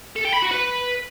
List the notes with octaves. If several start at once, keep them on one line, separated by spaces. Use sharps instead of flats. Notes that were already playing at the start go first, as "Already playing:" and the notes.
A4
G5
B5
F#4
B4